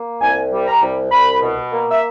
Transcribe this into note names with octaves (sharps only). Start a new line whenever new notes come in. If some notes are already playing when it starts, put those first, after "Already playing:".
Already playing: A#3
C2 G#5
G3
A#5
C2
C2 B5
B2
A#3
E5